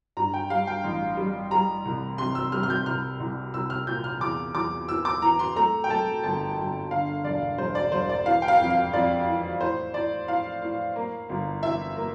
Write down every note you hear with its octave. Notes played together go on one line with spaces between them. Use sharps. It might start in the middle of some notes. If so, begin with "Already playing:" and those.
G2 A#5
G5
G3 F5
G5
A1
G3
G3 A#5
C2
C3 C6
E6
G3 F6
F6
G6
C2 F6
C2
C2 E6
F6
A#2 G6
F6
E2 D6
E2 D6
E3 E6
D6
E3 A#5
C6
A3 A#5
G5
A3 A5
G1 A5
G1
D3 F5
E1 D5
E1 C5
D5
E1 C5
D5
E3 F5
G5
F5
F2
F5
F2 D5
E3
A2 C5
A2 D5
A2 F5
A2
A#3
G1
E3 E5
A#3